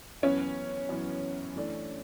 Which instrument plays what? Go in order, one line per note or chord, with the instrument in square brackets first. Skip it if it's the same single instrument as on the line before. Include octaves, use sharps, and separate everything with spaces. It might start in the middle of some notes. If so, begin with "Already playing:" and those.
[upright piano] F#2 E3 B3 [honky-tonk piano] C#4
[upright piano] F#2 E3 B3
E3 A3 D4